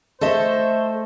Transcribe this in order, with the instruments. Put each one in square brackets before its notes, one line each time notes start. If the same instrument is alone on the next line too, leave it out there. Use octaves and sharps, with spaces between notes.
[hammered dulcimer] A3 C#5 [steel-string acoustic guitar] A4 D#5 E5 [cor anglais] C5